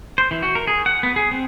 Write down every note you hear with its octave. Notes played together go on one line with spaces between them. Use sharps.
C5
E3
F#4
A#4
G#4
F#5
B3
G#4
C4